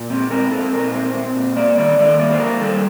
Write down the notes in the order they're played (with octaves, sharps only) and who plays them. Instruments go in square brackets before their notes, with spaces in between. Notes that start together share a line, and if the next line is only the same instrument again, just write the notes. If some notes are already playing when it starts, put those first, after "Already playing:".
Already playing: [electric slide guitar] A#2
C4
C4 A#4
C4 A4
A#2 A#4
C4 C5
C4
A#2
A#3 D5
D#3 D5
D#3 D5
A#3 D5
C5
F2 A#4
G3 A4